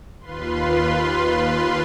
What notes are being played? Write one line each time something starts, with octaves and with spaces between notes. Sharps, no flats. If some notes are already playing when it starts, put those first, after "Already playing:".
D#2 F4 B4 C6